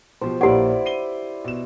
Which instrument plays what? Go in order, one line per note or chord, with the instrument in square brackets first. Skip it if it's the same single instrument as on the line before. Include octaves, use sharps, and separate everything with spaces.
[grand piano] B2 F3 G4 [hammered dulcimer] C5
[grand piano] A#1 A#3 C#5 [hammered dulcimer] E4 D5 [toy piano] G4 F#5
[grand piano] C7 D#7 G7
B2 E7